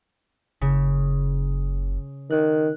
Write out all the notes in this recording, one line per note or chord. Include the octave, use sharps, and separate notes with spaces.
F#1 C#3
D#3 F#6